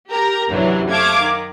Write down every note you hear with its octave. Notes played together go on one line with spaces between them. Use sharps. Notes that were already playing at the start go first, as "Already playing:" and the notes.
G4 A#4 A#5
F#2 C3 E3 F#3 D4
A3 F5 D6 G#6
D#3